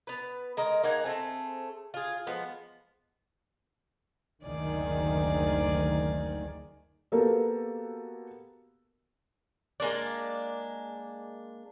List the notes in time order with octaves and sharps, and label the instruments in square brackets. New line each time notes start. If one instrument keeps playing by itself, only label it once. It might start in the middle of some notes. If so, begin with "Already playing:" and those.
[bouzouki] B3 B4
G#3 A#4 D#5
A#3 D#4 F#5 G#5
A3 C4 G#4
F4 G#4
F3 G#3 B3
[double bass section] F#1 D2 D#3 [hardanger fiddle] G#4 D5
[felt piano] A#3 B3 F#4 G4 A4 A#4
[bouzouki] G#3 A#3 D4 D5